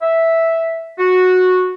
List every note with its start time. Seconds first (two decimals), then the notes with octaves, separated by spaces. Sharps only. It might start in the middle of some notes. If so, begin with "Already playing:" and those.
0.02 E5
0.99 F#4